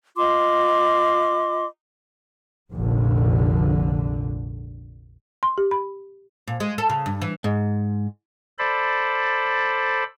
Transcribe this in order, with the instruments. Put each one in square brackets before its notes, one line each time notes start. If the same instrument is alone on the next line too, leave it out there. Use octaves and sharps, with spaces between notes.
[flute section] F4 D#5 C6 D6
[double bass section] F1 A#1 D3
[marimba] C6
G4
B5
[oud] A#2
G#3
A4
C#3
G2
E3
[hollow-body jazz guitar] G#2
[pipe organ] A4 C5 D5 B5